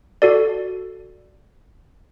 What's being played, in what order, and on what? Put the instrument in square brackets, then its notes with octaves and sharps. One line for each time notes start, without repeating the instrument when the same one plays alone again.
[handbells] F#4 A4 D5